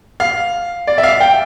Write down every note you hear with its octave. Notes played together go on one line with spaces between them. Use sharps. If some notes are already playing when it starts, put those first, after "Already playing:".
F5
D5
E5
F5
G5